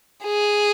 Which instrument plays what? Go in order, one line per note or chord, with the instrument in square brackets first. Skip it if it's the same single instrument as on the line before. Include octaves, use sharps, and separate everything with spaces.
[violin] G#4